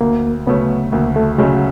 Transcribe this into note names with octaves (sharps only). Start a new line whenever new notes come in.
D2 A#3
C#3 F#3 A3 B3 C#4
D2 A#3
A3
C#3 F#3 G#3 A3 C#4